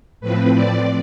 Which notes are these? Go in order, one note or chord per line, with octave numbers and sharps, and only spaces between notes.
A2 F3 C4 B4
D5